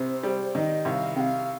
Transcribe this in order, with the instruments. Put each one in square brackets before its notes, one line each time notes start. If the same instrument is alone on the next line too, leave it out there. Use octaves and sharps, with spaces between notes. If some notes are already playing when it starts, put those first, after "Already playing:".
Already playing: [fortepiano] C2 C3 [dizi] C5
[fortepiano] G3
[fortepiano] D#3 [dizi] D#5
[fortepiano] C2 [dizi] G5
[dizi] F5
[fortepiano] C3 [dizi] F5 G5